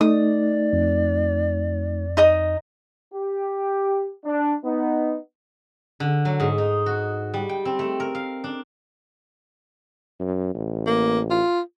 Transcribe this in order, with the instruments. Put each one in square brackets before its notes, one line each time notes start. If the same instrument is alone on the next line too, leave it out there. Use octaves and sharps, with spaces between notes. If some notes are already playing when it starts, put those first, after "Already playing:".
[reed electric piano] A3 D#4 [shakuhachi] D5 [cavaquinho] D#6
[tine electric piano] F2
[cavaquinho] D#4 D#5 D#6
[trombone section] G4
D4
B3 D#4
[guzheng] D3
F#3
G#2
D#4
F#4
G3
G5
C4
A3
A#4
F5
D4
[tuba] F#2
A1
[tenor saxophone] A#3
F4